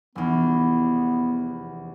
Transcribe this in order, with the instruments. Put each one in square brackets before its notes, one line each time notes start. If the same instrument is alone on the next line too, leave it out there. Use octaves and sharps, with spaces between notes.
[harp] F1 E2 [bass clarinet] B3